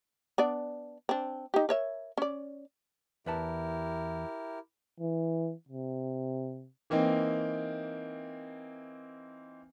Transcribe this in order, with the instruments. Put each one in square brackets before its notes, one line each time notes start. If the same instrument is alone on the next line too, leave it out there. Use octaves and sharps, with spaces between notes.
[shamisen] B3 D4 D5
C4 D4
D#4 G4
A#4 C#5 E5
C#4 D5
[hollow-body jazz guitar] E2 B4 A5 [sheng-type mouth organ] E4 G4 A#4
[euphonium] E3
C3
[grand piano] E3 A#3 C4 D#4